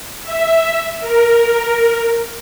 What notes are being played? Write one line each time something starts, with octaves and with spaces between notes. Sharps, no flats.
E5
A#4